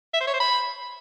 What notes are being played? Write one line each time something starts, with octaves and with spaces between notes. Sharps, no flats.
E5
C5
C#5
C5
B5